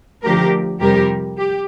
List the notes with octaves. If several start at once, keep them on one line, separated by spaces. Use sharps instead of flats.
D3 F3 A3 G4 A#4
F2 C3 G3 G4 A#4
G4